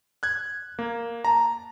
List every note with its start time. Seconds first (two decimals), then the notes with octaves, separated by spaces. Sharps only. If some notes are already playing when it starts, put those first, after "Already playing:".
0.23 F#6 G#6
0.79 A#3
1.24 A5 A#5